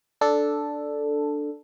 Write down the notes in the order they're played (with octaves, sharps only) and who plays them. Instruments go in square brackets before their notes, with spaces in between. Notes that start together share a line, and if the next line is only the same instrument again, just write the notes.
[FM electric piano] D4 A4